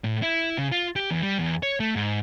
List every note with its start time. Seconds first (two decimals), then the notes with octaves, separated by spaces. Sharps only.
0.04 A2
0.22 E4
0.58 C#3
0.72 F4
0.96 G4
1.11 E2
1.22 G3
1.39 E2
1.63 C#5
1.80 A3
1.96 G#2